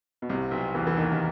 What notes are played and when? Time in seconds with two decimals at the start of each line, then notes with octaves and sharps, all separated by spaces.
0.22 B2
0.29 C2 C3
0.51 B1 B2
0.75 E2 E3
0.87 E3
0.97 D#2 D#3
1.12 D#3